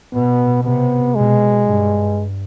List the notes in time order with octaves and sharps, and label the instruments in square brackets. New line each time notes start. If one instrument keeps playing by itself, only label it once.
[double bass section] B2 [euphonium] B3
[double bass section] C3 [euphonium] B3
[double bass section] B2 [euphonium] G#3
[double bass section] G2